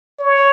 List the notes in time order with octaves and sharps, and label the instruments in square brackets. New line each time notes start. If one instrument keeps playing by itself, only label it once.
[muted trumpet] C#5